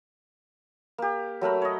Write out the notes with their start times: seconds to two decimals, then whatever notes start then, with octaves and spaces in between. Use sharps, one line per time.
0.98 A#3 G4
1.41 F#3 A3 A#4 B5
1.62 C#5 D#5